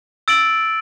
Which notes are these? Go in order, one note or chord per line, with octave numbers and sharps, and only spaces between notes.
E6 A6 D7 F#7